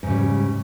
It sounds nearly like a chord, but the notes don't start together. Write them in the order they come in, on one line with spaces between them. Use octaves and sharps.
G#2 C#3 G3